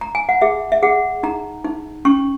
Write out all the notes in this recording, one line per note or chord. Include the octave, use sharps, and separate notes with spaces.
A#5
G#5
F#5
G#4 E5
E5
G#4 F#5
D#4 A#5
D#4
C#4 C#6